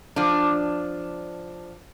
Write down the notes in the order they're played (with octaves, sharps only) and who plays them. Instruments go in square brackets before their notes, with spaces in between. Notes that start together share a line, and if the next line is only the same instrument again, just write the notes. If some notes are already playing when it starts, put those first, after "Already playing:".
[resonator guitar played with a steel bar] F3 D4